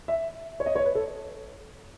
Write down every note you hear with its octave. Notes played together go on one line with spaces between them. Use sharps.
E5
C#5
D#5
C#5
B4
A4